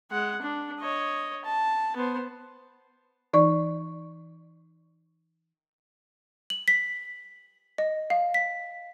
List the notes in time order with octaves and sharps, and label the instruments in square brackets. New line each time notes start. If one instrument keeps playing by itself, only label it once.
[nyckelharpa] G#3 F#5
D4
C#5 D#5
A5
B3 C5
[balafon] E3 D#4 D5 C#6
[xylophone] F#7
B6
D#5
F5
B6